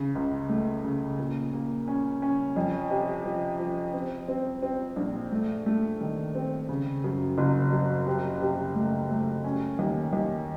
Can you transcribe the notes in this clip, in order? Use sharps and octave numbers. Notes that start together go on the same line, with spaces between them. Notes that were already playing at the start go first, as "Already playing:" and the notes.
Already playing: C#3
C#2
A3
C#3
A#2
A#3
C#4
C#4
F2
C3
F3
F3
C4
C4
C4
A#1
A3
A3
D#3
C4
C#3
F#2
F#1
F#2
C3
C3
A3
A3
C#4
D#2
D#2